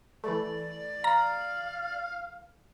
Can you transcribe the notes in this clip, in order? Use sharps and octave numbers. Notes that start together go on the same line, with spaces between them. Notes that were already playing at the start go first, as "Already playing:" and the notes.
E3 A3 D5
F5 A#5